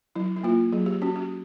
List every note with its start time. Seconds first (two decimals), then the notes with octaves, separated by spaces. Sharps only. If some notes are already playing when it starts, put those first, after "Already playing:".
0.16 F#3 E4
0.36 E4
0.43 A#3 F4
0.72 F#3 G#4
0.86 G4
1.02 C#4 F#4
1.16 F#4